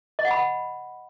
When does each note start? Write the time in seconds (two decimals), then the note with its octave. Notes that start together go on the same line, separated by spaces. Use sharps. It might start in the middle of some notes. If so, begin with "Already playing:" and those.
0.19 D#5
0.25 F#5
0.31 B5
0.37 F#5